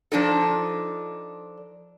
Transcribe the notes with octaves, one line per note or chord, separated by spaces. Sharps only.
F3 D4 D#4 A4